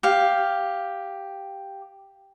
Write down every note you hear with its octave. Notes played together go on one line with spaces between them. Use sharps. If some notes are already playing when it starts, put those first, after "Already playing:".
G4 F5